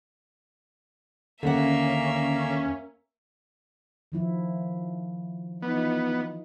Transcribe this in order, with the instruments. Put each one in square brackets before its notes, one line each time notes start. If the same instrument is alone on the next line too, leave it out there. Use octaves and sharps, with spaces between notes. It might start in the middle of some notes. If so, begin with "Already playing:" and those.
[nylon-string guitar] D#2 F#5 [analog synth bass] D3 [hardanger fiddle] A#3 E5 [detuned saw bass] C#4
[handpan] D#3 F3 E4
[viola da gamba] E3 D#4 F4 [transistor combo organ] B3